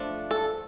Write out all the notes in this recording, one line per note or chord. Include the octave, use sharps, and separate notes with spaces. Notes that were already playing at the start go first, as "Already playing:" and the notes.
Already playing: F3 A3 D4
A4